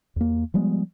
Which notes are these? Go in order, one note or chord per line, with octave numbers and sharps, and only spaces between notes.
E2 A#3
F3 G3 G#3 B3